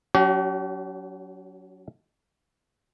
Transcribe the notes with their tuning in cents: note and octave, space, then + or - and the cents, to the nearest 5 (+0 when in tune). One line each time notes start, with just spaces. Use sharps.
F#3 +0 C#4 +40 G4 -45